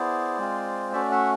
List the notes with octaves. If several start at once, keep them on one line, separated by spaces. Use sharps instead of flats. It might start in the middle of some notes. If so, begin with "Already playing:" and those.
Already playing: B3 E4 G#4 C5 D5
G#3 C4 F4
A3 C#4 F#4 D5 E5
E5 F#5